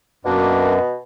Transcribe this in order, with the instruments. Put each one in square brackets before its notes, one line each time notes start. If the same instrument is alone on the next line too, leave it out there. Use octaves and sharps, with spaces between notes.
[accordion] F#2 [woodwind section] B2 [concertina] A#3 D4